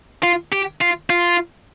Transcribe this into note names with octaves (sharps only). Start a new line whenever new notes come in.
F4
G4
F4
F4